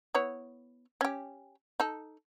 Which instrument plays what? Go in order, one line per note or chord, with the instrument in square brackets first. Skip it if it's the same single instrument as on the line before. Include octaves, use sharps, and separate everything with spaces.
[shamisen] B3 E4 C#5
C#4 G4
D#4 A4